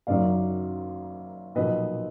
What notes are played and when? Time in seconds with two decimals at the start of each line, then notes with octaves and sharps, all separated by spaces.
0.07 F#1 F#2 D#3 F#3 D5 F5
1.55 B1 A#2 F3 B4 D#5